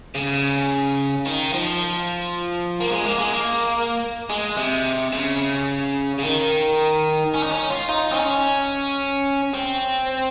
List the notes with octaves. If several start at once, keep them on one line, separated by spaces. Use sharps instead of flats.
C#3
D#3
F3
A#3
G#3
A#3
G#3
A#3
G#3
C3
C#3
C#3
D#3
C#4
D#4
C#4
F4
D#4
C4
C#4
C4